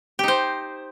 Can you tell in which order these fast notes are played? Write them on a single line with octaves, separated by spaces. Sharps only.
G4 D#4 C5